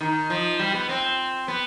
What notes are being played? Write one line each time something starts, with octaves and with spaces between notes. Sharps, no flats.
D#3
F3
G3
B3
C4
B3